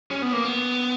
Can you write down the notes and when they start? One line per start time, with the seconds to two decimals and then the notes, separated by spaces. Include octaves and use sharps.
0.11 C#4
0.22 B3
0.33 A#3
0.44 B3